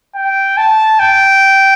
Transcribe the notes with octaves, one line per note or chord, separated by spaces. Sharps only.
G5
A5
G5